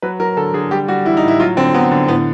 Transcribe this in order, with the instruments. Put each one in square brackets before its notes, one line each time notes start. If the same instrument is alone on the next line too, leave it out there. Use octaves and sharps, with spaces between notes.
[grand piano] F#3 B4
F#3 A#4
D3 A4
D3 G#4
G3 G4
G3 F#4
E3 E4
D#4
A2 E4
F#3 F4
D3 C4
F#3 B3
D3
A2 B3